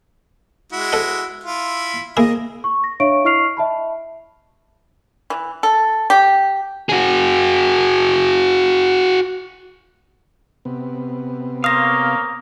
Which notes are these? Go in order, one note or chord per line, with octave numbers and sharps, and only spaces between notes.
G#3 E4 F#4
A4 D#5 F#5
E4 F4
A#3 E4 G#4 D#5
C#6
A#6
D4 C#5 E5 F5 C#6 D7
E4 D#5 C#6 F6 C7 F7
D#5 E5 A5 B5
E3
A4
G4
F#4 G#4
C3 B3
A#3 C5 C#5 F5 D#6 A#6